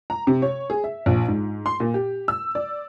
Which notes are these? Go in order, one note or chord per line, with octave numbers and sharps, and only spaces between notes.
A#5
C3
C#5
G#4
E5
A#1
G#2
C6
A#2
G4
E6
D5